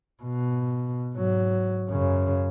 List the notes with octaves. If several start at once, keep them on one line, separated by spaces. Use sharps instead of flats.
B2
G#2 F#3
F#2 C#3